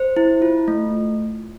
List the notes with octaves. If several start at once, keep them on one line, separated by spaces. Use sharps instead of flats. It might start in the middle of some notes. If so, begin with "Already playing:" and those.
Already playing: C5
E4
F4
A3